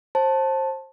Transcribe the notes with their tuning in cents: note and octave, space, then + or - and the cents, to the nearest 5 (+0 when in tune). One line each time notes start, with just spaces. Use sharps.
C5 +25 A5 +0